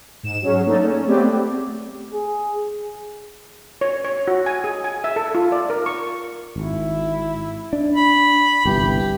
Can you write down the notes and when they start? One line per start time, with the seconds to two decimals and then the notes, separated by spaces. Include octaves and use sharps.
0.23 G#2 E7
0.42 F#3 C#4 G#4
0.66 A3 A#3 D4 D#4 A4
0.83 C#4
1.07 A3 B3 C4 G4 G#4 D5
2.13 G#4
3.81 C#5
4.04 C#5
4.28 F#4
4.46 G#5
4.64 G#4
4.84 G#5
5.04 E5
5.16 A4
5.35 F4
5.52 D5
5.70 A#4
5.86 C#6
6.56 G#1 E4
7.73 D4
7.94 B5
8.65 G1 C2 E3 G4